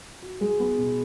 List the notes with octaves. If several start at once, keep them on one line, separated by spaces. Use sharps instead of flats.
F#4
G#3
B3
B2